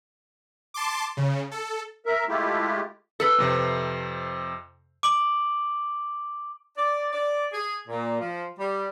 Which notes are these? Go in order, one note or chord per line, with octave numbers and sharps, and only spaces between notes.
A5 C6 D6
C#3
A4
A#4 E5
G#3 A3 E4 F4 G4
A4 B4
F2 C3 C5
D6 D7 F#7
D5
D5
G#4
A#2
F3
G3